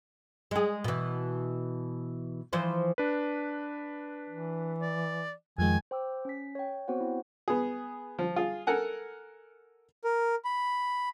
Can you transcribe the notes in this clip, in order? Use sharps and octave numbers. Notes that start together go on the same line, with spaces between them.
G#3 G#4
B2 E3
E3 F3 C5
D4 B4
E3
D5
F2 D#3 F3 G#3 G#5
C5 G5 D6 E6
C#4 B6
C#5 G5
B3 C4 F#4 C5 C#5 F#5
E4
B3 G#4
F3
F4 G#4
A4 A#4 F#5 G#5
A#4
B5